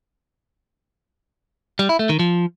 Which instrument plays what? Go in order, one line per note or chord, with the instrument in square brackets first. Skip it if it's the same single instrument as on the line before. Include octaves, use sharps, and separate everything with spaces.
[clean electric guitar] G3
E4
A3
D#3
F3